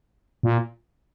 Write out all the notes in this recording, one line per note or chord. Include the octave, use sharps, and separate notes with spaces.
A#2